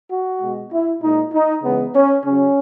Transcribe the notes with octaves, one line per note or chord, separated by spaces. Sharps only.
F#4
B2 G#3
E4
A#2 G#3 D#4
D#4
C#3 E3 G#3 B3
C#4
C#3 F#3 C#4